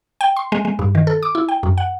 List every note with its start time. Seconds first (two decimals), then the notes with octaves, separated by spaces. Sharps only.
0.21 G5
0.36 C6
0.52 G#3
0.65 G#3
0.79 G2
0.95 D#3
1.07 A4
1.23 D6
1.35 E4
1.49 G5
1.63 F#2
1.78 F#5